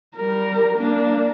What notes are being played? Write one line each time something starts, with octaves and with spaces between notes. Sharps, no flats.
G3 A#4
A#3 D4